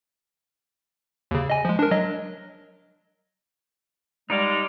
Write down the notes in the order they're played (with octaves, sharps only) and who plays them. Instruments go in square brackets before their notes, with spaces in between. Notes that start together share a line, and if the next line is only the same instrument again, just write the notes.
[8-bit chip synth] D#2 C#3
D#5 G#5
F3 G#3
D4 A#4
F#3 D#5
[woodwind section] G3 G#3 [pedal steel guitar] D#4 D5 F5